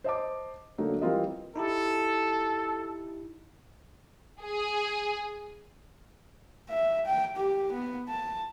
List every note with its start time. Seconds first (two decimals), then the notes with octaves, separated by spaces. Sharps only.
0.04 C5 D#5 A5 D6
0.78 D3 F#3 A3 A#3 D#4 F#4
1.01 E3 G3 C4 F4 A#4 D#5
1.56 D#4 E4 G4 A4
4.41 G#4
6.69 E5
7.06 G5
7.36 G4
7.72 B3
8.09 A5